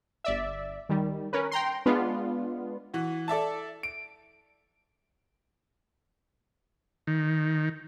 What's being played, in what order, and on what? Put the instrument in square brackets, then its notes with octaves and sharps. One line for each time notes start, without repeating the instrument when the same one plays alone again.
[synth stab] G1 D5 E5
D#3 G3
C#4 A#4 B4
G5 A#5 C6
G#3 B3 D4 F4
[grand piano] E3 F#4
A4 D5 E5 A5
D7
[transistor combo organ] D#3